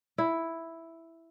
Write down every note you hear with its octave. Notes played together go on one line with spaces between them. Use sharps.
E4